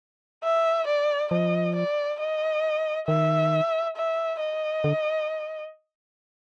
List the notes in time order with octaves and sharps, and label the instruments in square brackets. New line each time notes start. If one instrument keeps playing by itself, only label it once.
[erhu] E5
D5
[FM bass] F3 [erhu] D#5
[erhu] D5
D#5
[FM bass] D#3 [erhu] E5
[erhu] E5
D#5
[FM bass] D3